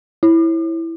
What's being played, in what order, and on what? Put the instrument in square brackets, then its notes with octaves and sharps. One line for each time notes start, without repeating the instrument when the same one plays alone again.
[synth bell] E4